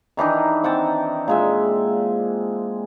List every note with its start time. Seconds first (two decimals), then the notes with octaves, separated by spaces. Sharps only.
0.17 D#3 E3 D4 D#4
0.64 C4 F#5 G5 A5
1.28 A#2 G#3 E5